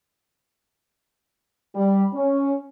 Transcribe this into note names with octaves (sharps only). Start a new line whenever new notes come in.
G3
C#4